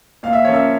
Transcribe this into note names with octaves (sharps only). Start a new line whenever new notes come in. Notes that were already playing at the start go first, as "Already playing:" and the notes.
A#2 F5
E5
F3 A#3 C#4 C#5
E5